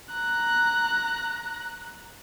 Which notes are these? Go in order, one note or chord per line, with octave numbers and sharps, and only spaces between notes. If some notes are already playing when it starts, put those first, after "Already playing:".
A#5 F#6